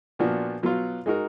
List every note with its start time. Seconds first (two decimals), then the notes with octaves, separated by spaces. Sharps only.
0.19 A#2 F3 B3 D4 F#4
0.63 B2 F#3 B3 F4
1.06 G#3 D#4 F#4 A#4